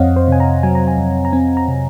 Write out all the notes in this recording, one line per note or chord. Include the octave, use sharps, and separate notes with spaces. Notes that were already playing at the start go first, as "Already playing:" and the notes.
Already playing: F2 C4 C#5 D#5 F5 F#5
C5
C3 G#5
A#5
F#3 G#5
A#5
G#5
F2
A#5
C4 G#5
A#5
C3